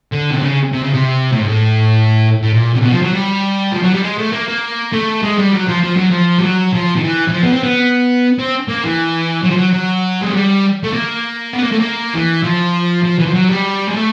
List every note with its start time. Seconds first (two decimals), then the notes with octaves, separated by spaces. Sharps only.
0.12 D3
0.31 C3
0.42 C#3
0.72 C3
0.84 C#3
0.94 C3
1.32 A2
1.39 G#2
1.47 A2
2.42 A2
2.53 A#2
2.73 C3
2.82 B2
2.92 F3
3.02 F#3
3.13 G3
3.72 F3
3.83 F#3
3.93 G3
4.03 G#3
4.18 A3
4.32 A#3
4.48 A#3
4.93 A3
5.23 G#3
5.38 G3
5.52 F#3
5.68 F3
5.83 F3
5.97 F#3
6.10 F3
6.38 G3
6.43 F#3
6.73 F3
6.96 D#3
7.04 E3
7.28 E3
7.33 F3
7.43 B3
7.53 C4
7.63 B3
8.38 C4
8.68 A#3
8.83 E3
9.43 F#3
9.51 F3
9.57 F#3
9.73 F#3
10.22 G#3
10.33 G3
10.84 A3
10.94 A#3
11.53 B3
11.63 A#3
11.71 A3
11.79 A#3
12.14 E3
12.43 F3
13.04 F3
13.19 E3
13.26 F3
13.34 F#3
13.49 G3
13.87 G#3
13.94 A3